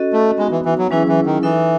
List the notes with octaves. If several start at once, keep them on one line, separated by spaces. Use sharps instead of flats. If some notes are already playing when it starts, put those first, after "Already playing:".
Already playing: C#4 F#4 A4 D#5
A3
G#3 B3 D#4 F#4
E3
E3
F#3
E3 F#3 C#4 E4 G#4
E3
D#3
E3 D#4 A4 E5